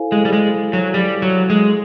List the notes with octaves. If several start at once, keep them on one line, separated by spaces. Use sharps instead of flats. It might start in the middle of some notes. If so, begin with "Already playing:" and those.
Already playing: E4 A4 C5 F5 G#5
G#3
G3
G#3
F#3
G3
F#3
G#3